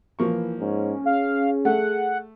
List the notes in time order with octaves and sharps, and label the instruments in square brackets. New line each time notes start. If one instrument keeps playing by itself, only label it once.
[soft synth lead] E3 [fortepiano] F3 A#3 C#6
[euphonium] G#2 [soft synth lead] C#4
[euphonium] G#4 [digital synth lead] F5
[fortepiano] A3 [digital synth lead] F#5